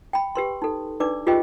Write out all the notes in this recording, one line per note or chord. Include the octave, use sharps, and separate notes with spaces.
G5 B5
G4 B4 C6
D#4 A4
D4 D#4 B4 D5 D6
F4 G4 G#4 B4 D#5 G5